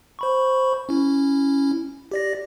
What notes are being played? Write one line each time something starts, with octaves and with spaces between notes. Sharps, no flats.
C5 B5 C#6
C#4 E4
G4 D5 A#6